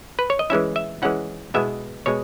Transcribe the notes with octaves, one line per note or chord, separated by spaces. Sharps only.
B4
C#5
D#5
E3 G#3 C#4 E4 E5
E5
E3 G#3 C#4 E4 F#5
B2 G#3 B3 E4 E5
B2 G#3 C#5